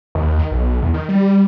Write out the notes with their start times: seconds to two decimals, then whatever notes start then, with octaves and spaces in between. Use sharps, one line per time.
0.15 D#2
0.39 D#3
0.51 B1
0.68 B1
0.82 E2
0.94 D#3
1.09 G3